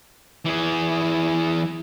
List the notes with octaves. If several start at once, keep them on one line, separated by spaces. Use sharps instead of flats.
E3 G#4